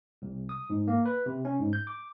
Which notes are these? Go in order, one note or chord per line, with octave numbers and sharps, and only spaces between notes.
C2
D#6
G#2
A#3
B4
C3
C#4
G#2
G6
D6